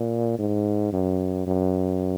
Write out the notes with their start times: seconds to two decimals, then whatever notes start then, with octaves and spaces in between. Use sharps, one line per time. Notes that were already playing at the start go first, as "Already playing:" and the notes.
Already playing: A#2
0.39 G#2
0.93 F#2
1.47 F#2